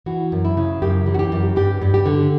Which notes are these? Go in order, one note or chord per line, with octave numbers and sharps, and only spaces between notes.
E3 F#4
F#2
E4
C#3
F#2 G4
E3
F#4
G4
F#2
G2 G4
G2
G4
D3